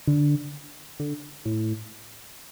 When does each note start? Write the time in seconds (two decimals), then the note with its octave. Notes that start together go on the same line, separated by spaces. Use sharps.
0.07 D3
1.00 D3
1.45 A2